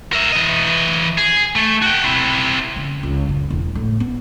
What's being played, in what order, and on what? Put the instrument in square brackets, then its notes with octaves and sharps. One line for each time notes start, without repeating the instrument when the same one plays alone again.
[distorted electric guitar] A#4 E5
E3 D#5
G#4
A3
F#4 G5
C4 E4
[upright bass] C#3
C#2
F#2
E1
A2
B3